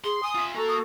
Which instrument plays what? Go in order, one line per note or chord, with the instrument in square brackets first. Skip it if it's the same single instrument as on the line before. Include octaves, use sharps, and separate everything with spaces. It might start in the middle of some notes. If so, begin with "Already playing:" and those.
[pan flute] G#4 [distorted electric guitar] C6
[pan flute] G#5 [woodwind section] D#6
[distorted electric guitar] F4 E5
[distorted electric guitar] A#3 A#5 [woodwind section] F#4 A4
[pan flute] D#6